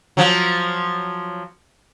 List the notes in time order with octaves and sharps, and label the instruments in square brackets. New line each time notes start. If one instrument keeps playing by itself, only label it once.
[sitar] F3 F#3